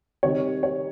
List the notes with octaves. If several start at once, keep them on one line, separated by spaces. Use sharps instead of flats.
C3 D#3 G3 C#5
C#5